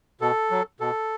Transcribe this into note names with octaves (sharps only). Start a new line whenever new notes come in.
B2 A4
F#3
B2 A4